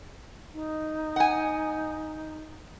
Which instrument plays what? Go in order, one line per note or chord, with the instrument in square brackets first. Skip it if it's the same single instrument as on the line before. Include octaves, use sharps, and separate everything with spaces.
[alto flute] D#4
[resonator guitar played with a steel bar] F#5 G#5